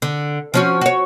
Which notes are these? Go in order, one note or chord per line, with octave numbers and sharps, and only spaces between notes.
D3
F3 C#4 F#4
F#4 C#5